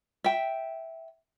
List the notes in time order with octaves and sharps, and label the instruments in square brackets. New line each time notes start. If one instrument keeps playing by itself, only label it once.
[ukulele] E5 G5